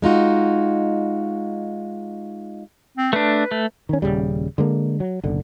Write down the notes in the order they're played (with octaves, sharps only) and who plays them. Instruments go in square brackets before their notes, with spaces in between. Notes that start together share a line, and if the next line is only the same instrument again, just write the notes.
[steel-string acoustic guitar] G#3 D#4 F4 F#4
[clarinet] C4
[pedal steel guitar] A3 D4 [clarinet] B4
[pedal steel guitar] A3
[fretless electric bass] D#3 C#4
D#1 C2 C#3 G3
D3 G#3 A#3
F#3
F#1 B1 D3